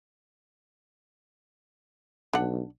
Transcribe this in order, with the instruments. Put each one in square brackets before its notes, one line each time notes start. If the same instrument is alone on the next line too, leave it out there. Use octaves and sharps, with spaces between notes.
[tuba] B1 [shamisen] D4 F#5